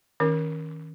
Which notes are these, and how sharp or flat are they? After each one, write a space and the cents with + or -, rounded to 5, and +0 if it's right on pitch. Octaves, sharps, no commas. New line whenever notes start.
D#3 +30 C#4 +0 A#4 +10